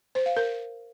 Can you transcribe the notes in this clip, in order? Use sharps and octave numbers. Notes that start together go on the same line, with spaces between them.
C5
F5
A#4